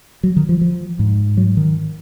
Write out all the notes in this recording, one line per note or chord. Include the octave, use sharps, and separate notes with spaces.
F#3
D#3
F3
F3
G#2
F#3
D#3